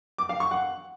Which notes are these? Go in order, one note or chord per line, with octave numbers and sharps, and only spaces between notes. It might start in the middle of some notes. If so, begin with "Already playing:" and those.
D6
F5
C#6
F#5